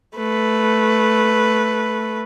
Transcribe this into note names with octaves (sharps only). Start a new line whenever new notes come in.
A3 B4